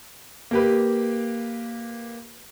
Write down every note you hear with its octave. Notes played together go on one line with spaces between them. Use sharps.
A#3 G4 B4